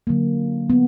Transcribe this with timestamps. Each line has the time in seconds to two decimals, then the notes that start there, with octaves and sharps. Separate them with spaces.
0.07 D3 F#3 A#3
0.70 B3